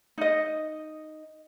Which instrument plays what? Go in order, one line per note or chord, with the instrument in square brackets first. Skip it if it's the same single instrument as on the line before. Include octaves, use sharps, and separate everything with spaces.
[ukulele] D#4 D#5